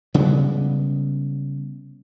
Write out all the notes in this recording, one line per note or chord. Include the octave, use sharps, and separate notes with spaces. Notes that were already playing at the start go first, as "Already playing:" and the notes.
C#3 G3 G#3 B3